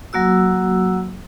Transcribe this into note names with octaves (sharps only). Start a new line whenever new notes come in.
F#3 A#3 F#4 E6